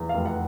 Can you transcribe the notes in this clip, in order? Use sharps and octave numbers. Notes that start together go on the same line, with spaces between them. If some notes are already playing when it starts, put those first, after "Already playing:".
Already playing: E2
F5
F1
F#5